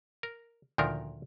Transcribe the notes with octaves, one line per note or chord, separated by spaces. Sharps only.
A#4
D2 A#2 D#3 F3 D4 A#4